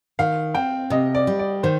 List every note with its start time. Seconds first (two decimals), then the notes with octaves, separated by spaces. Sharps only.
0.19 D#3 F5
0.55 C4 G5
0.90 C3 D#5
1.15 D5
1.27 G3
1.39 D5
1.63 D#3 C5